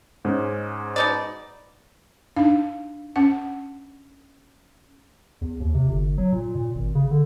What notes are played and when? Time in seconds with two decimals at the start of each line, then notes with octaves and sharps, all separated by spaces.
0.25 G#2 G#3 C#4
0.96 B2 D#4 D5
2.36 D4 D#4 F5
3.16 C#4 F#5
5.41 E2
5.60 D#2
5.74 C3
5.87 G1
6.18 F#3
6.32 A#2
6.55 A#2
6.75 G#1
6.95 C#3
7.11 D3